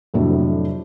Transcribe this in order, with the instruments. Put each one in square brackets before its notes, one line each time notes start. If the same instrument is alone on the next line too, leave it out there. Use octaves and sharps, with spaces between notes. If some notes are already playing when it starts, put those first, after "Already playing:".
[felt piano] F2 A2 C3 F#3 D4